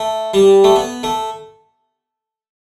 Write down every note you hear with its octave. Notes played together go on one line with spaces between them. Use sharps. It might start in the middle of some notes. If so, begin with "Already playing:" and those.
Already playing: A3
G3
A3
B3
A3